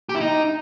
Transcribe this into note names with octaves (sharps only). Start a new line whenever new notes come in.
G4
E4
D#4